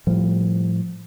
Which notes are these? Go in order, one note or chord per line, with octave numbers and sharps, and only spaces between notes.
A2 F3 G3